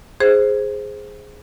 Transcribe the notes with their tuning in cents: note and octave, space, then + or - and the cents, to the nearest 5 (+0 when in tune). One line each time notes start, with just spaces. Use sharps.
G#4 +0 C5 +0